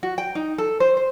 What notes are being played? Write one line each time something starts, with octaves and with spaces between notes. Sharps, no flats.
F#4
G5
D#4
A4
C5
C5